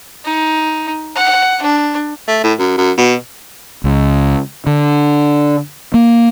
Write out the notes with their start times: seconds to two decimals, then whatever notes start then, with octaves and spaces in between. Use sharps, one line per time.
0.25 D#4
1.16 F#5
1.62 D4
2.28 A3
2.44 A2
2.59 F#2
2.78 F#2
2.98 B2
3.84 C#2
4.66 D3
5.94 A#3